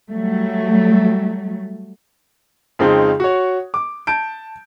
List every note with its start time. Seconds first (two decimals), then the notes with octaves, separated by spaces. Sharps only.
0.10 F#3 G3 A3
2.79 F2 C#3 G#3 C4 D#4
3.20 F#4 C#5
3.74 D6
4.07 A5 G6 D7